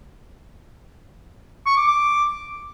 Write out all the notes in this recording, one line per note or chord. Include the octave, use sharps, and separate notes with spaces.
C#6
D6
D6